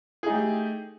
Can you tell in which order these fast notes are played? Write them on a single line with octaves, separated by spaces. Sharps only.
G#4 D#4 A3 G4